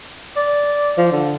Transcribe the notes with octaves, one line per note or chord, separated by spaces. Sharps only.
D5
F3
D3